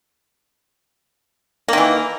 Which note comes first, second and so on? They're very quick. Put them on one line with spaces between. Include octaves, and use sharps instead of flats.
A#3 D#3 E3